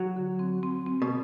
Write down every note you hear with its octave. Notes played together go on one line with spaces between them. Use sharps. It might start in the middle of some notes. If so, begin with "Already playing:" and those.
Already playing: F#3
D3
C4
C4
C4
B2